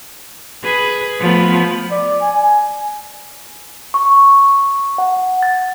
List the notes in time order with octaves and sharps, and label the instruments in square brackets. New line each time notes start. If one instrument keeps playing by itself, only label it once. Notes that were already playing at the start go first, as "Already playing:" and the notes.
[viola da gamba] G#4 B4
F3 A3 B3
[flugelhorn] D5
G#5
[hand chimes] C#6
F#5
A6